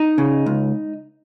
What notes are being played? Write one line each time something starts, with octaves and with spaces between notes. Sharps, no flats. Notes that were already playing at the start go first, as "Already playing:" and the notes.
Already playing: D#4
C#3
C#2